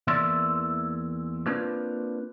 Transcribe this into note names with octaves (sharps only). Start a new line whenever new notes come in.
E2 E3 A#3 D5 E5 C6
A#3 C4 D4 F4 B4